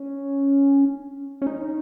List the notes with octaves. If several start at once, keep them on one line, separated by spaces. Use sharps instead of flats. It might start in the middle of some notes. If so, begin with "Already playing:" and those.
Already playing: C#4
C#4
D#4